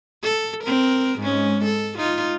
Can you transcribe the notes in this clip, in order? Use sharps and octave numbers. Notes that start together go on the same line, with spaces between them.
A4
C4 A#4
G#2 G#3 C#4
A4
D#4 F4